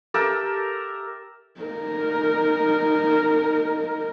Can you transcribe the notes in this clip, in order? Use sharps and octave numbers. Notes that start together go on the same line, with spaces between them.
G4 A4 A#4 E5
D#4 A#4